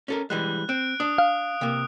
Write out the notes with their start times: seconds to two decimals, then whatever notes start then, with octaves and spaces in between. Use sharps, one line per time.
0.08 C#4 A4 A#4
0.30 E3 G3 G#3 F#6
0.69 C4 F#6 D7
1.00 D4 D#6
1.18 F5
1.61 C3 A#3